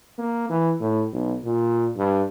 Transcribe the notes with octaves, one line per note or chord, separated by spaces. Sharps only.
A#3
E3
A2
B1
A#2
G2